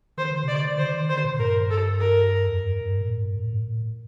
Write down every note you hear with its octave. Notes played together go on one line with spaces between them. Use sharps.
D#3 C5
D3
C3 D5
D3
D#3 C5
D#3
D3 C5
A#2
G2 A#4
A4
A#4
F2
G2
G2
A2
G2
A2
A2
A2